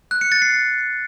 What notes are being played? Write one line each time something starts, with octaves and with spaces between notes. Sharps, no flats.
F#6
C#7
A6
C7